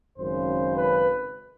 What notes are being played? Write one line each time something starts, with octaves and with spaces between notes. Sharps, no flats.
G#1 F#2 C#3 C5
B4